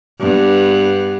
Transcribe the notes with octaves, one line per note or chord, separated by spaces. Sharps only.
G2 B3